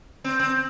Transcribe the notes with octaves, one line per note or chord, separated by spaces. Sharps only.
C4
C4